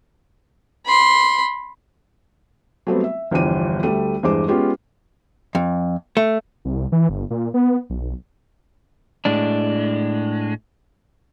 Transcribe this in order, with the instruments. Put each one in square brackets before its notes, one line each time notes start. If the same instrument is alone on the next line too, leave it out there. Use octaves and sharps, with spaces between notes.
[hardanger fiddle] B5 C6
[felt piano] F#3 G3 A3 B3 C4
E5
G1 E2 F3 G3 D4 D#7
D2 G3 A3 D#7
E2 G2 G#3 C5 D6
G#3 B3 C#4 F4 G4
[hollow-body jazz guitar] F2
A3
[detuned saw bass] C2
E3
G1
A#2
B3
B1
[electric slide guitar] A2 G#3 D4